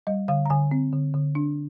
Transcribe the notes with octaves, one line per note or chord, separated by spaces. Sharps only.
G3 D#5
D3 F5
A#5
D3 G#5
C4
D3
D3
D4